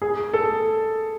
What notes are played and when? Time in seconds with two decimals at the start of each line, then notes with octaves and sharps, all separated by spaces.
0.02 G#4
0.33 A4